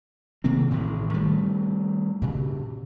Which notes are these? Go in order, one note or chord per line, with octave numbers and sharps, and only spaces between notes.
C3 D#3 A#3 C4
A1 A2 D#3
D#3 G3 A3
A#2 C#3